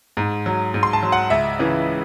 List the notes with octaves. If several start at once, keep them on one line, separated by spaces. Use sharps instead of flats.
G#2
F#3
G#2
C6
A5
F#3
F#5
C#2 E5
C#3 E3